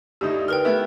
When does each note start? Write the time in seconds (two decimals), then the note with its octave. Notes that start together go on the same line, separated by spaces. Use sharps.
0.21 D2 D#4 E4 G4
0.48 A#4 B4 G5 F6
0.65 A3 B3 E4